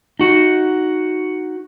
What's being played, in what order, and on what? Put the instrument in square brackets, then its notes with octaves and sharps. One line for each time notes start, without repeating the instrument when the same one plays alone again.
[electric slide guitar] D#4 F#4